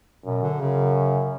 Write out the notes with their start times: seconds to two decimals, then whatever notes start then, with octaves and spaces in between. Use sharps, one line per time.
0.25 F#2 B2
0.43 D3
0.60 F#2 C#3